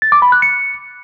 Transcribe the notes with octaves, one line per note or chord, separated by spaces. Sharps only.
A6
D6
B5
F#6
C#7